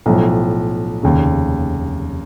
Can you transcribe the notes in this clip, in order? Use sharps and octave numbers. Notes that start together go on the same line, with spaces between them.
B1 A2 F3
F1 D#2 C#3